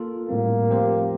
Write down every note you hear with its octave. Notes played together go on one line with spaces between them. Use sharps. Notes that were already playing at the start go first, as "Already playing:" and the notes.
Already playing: A#3 F4 A4
A2 G3 A#3 C4
F3 A3 C4 G4 C5